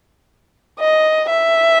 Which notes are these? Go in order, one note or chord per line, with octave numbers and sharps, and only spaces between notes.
D#5
E5